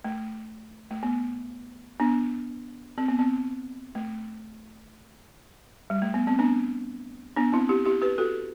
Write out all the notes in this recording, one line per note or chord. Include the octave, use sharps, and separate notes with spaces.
A3
A3
B3
B3 D4
C4
B3
C4
A3
G3
A3
B3
C4
B3 D4
B3 D4
C4 E4
E4 G4
E4 G4
G4 B4
F#4 A4